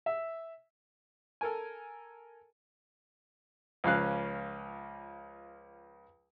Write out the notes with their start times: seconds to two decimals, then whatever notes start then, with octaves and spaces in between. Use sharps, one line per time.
0.06 E5
1.41 A4 A#4 G#5
3.84 C#2 F3 C#4 F5 F#6